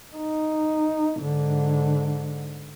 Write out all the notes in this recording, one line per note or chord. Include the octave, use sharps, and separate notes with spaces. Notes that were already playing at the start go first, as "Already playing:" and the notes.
D#4
G#2 D3